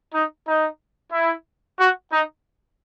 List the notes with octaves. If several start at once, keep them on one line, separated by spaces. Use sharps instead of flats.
D#4
D#4
E4
F#4
D#4